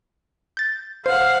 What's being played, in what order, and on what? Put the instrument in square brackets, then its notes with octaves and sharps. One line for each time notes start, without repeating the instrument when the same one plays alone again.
[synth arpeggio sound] G6 A6
[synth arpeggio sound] C5 [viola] F5 F#5